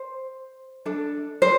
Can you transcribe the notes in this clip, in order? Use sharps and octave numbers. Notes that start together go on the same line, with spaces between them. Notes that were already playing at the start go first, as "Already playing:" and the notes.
Already playing: C5
D4 A4
C5